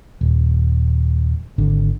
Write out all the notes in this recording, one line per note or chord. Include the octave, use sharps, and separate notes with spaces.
D#1
G#1 D3